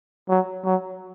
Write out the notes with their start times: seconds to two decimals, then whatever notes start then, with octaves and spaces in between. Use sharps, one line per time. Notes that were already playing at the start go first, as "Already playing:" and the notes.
0.29 F#3
0.65 F#3